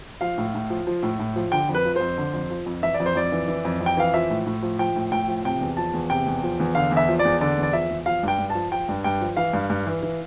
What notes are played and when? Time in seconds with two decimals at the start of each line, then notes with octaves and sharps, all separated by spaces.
0.21 F3 F5
0.38 A2
0.55 A2
0.70 F3
0.87 F3
1.03 A2
1.19 A2
1.36 F3
1.52 D3 G5
1.69 F2
1.75 B4
1.85 F3
1.96 F2 C5
2.18 D3
2.34 F2
2.50 F3
2.66 F2
2.82 E3 E5
2.94 D5
3.00 F2
3.06 C5
3.16 F2 D5
3.32 E3
3.48 E3
3.65 F2
3.81 F2
3.86 G5
3.97 E3 F5
4.14 F3 E5
4.30 A2
4.46 A2
4.63 F3
4.79 F3 G5
4.96 A2
5.12 A2 G5
5.28 F3
5.45 C3 G5
5.61 E2
5.77 F3 A5
5.94 E2
6.10 C3 G5
6.27 E2
6.43 F3
6.60 E2
6.75 D3 F5
6.91 E2
6.97 E5
7.09 F3
7.19 D5
7.25 E2
7.41 D3 D5
7.58 E2
7.63 D5
7.73 F3 E5
7.90 E2
8.06 F3 F5
8.23 G2 G5
8.39 G2
8.50 A5
8.55 F3
8.72 F3 G5
8.89 G2
9.04 G2 G5
9.21 F3
9.37 E3 F5
9.53 G2
9.70 G2
9.86 E3
10.03 E3